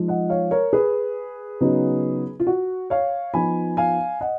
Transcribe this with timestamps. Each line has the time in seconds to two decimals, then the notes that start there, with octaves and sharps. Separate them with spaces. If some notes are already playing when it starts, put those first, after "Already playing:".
Already playing: F3 G#3 D#4
0.08 D#5 F#5
0.30 C#5 F5
0.51 A#4 C#5
0.73 G#4 B4
1.61 C#3 F#3 B3 D#4
2.40 F4
2.47 F#4
2.90 C#5 F5
3.34 F3 B3 D#4 G#5 B5
3.77 F5 G#5
4.21 D#5 F#5